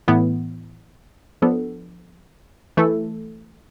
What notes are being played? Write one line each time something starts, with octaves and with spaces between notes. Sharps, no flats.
A2 E3 B3 E4
F3 B3 D4 A4
E3 A3 E4 A4